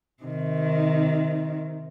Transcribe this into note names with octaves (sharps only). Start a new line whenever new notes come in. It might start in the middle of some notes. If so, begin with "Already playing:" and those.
C3 D#3